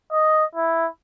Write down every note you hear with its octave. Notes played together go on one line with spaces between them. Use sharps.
D#5
E4